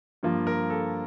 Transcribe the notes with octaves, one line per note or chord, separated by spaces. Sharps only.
G2 F3 A#3 F4
A#4
A4